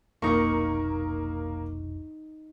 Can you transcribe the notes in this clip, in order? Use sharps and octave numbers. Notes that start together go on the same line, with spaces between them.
F1 B1 A#3 D#4 A#4 C#6